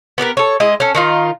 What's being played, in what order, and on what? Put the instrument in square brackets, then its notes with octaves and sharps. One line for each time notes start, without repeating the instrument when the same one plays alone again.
[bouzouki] B3 G4 G#4 A#4
A4 C#5
G#3 E4 D#5
C#4 A4
D#3 D#4 F4